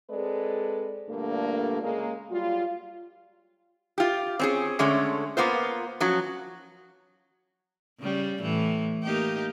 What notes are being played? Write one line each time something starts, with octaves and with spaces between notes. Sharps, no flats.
G#3 C4 A4 B4 D5
G2 A#2 D3 A3 A#3
C#3 G#3 A#3
F#3 G3 F4
F4 G4
C4 C#4 G#4
D3 G#3 A3 C#4
A#3 B3 F4 C5
F3 F#3 C#4
C#3 G3
A2 E3
A#3 D#4 G4